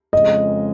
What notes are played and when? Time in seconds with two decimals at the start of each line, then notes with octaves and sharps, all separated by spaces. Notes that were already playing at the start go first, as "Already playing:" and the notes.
0.13 F2 C#3 G#3 D#5